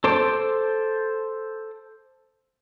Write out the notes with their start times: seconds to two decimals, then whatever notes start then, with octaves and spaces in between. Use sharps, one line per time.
0.04 A4 C5 C6 D6